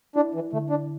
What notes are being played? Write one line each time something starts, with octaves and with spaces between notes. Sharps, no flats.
D4 E4
E3
D3 A3
D4